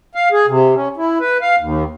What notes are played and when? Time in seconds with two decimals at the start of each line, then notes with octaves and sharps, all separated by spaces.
0.15 F5
0.32 G#4
0.48 C3
0.75 C#4
0.97 E4
1.20 B4
1.42 F5
1.60 D#2